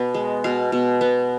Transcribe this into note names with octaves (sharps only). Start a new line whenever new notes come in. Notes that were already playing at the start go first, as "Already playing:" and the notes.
Already playing: B2 B3 B4
G#3
B2 F5
B2
B3